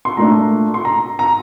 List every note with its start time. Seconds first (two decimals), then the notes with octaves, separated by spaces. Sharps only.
0.05 C6
0.17 A#2 A3 D4 A#5
0.74 C6
0.85 A#5
1.19 A#5